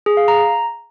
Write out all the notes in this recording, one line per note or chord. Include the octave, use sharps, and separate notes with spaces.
G#4
F5
A#5